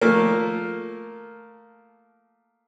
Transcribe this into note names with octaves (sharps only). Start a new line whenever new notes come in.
F3 A3 A#3